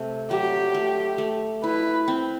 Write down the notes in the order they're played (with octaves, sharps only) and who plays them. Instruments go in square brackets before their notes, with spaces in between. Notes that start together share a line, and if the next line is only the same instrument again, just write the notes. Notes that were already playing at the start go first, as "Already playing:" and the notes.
Already playing: [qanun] C3 A3
[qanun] F#3 [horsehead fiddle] G4
[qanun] A3
A3
[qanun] E4 [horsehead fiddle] B4
[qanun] C4